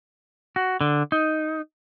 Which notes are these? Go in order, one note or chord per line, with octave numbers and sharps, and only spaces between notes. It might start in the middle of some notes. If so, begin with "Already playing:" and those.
F#4
D3
D#4